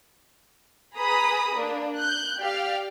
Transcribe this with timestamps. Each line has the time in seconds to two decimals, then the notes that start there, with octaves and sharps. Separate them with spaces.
0.97 G#4 B4 A#5 B5 D#6
1.55 A#3 D4
1.98 F#6 G6
2.41 G4 D5 F5 F6